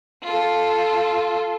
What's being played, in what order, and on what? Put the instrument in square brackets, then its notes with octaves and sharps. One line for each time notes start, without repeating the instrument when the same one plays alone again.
[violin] F4 A4